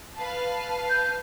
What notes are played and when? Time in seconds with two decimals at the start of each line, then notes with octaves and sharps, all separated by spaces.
0.18 B4 F5 A5
0.90 G6